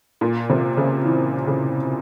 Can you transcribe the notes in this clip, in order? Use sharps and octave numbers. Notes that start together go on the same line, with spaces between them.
A#2
C3
C#3
E3
C#3